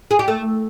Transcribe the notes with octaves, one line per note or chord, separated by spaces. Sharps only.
G#4
G4
A3